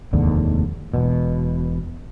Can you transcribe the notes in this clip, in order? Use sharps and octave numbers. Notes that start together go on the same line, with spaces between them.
F1 D#2 G#2 D3
E1 B2